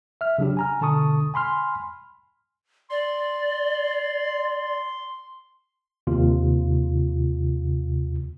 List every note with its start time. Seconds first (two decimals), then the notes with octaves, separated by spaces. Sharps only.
0.21 E5 F6
0.38 C#3 F#3 D4 G4
0.57 G#5 A#5 F6
0.81 B2 D3 A5 C#6 D#6
1.34 G#5 B5 C6 F6
2.91 D5 C6
6.07 D#2 C3 F4